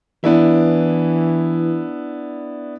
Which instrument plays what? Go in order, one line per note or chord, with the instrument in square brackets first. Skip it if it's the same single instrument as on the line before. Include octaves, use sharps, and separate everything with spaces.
[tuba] E3 [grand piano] B3 D4 E4